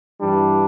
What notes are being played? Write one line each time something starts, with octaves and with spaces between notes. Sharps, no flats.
G2 E3 G3 D4